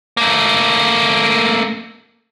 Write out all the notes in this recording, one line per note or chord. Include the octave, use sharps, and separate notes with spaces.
A3 A#3